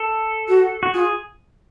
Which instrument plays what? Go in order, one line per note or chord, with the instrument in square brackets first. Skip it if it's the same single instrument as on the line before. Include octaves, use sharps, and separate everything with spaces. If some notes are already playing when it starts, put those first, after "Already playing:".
Already playing: [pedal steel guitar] A4
[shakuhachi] F#4
[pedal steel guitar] F#4
[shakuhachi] F4 [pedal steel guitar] G#4